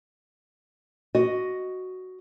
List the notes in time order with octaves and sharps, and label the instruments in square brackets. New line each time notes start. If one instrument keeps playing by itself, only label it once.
[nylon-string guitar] F#4 D#5